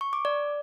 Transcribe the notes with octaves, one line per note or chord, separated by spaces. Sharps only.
C#6
D6
D5